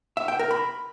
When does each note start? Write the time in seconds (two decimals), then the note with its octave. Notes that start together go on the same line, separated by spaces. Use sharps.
0.17 E5
0.28 G5
0.39 A#4
0.51 B5